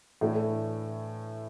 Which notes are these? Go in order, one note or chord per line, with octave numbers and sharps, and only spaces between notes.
A2 E3 A3 D4